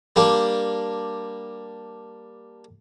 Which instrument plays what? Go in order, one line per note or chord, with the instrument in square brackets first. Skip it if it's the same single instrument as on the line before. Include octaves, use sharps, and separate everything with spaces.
[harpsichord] G3 A#3 D4